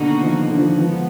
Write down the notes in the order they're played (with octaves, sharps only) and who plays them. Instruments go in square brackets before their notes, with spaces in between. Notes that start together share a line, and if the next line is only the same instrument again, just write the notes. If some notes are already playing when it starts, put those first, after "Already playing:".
Already playing: [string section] B2 A#3 D#4 F#4 [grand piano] D3
[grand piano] D#3
F3
D#3
D3
F3
D#3
[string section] G#2 B3 [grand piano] F3